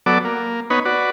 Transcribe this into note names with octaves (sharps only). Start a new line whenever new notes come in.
F#3 B3 A4 D5 D6
A#3
B3 D#4 B4 C#5
F#4 B4 D5